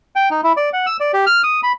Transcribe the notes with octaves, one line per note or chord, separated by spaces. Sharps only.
G5
D#4
E4
D5
F#5
E6
D5
G4
F6
D#6
B5